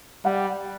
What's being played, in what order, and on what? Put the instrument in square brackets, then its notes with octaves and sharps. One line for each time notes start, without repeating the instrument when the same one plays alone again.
[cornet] G3 [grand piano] F#5